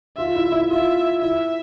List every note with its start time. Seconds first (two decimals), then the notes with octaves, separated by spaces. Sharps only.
0.17 F4 E5
0.36 E4
0.52 E4
0.70 F4 E5
1.22 E4 E5